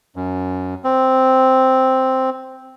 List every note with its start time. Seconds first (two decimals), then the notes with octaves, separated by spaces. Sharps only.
0.16 F#2
0.84 C4